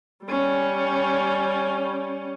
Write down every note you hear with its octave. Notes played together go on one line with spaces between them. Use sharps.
G3 C#4